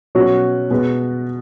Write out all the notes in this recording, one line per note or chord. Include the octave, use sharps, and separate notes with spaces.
B2 F#3 C#4 F#4
B2 G#3 B3